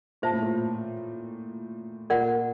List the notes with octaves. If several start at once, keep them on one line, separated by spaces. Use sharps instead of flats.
A#2 C5 E5 A5
A2
A#2
A#2 A#4 D5 F#5